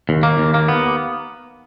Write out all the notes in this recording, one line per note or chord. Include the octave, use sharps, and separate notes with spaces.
D#2
A#3
D#2
A#3
B3